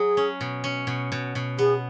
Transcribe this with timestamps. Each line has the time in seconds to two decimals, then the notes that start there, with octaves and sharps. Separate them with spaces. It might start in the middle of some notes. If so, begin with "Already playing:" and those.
Already playing: F#3 G#4
0.17 C#4
0.41 B2
0.64 C#4
0.87 B2
1.12 B2
1.35 B2
1.59 B3 G#4